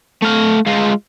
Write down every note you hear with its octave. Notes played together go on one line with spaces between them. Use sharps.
A3 F5
G#3 F4